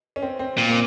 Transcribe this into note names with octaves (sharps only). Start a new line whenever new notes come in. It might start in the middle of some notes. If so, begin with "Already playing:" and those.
C#4
C4
C4
A#2 C4
A#3